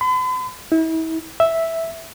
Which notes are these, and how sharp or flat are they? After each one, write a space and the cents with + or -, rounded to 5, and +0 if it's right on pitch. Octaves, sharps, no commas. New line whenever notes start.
B5 +45
E4 -35
E5 -5